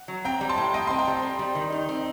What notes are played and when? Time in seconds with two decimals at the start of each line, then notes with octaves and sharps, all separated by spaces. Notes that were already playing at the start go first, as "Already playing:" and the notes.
Already playing: F#5
0.08 F#3
0.24 C4 G5 A#5
0.41 G3
0.49 A5 C6
0.58 A2
0.74 A2 D#5 G5
0.87 C4 C6
0.99 G5 A#5
1.07 G3
1.22 C4
1.39 G3
1.55 D#3
1.72 D#4
1.89 C4